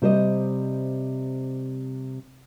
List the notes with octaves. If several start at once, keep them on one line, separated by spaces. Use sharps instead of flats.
C3 G3 C5 C#5 D#5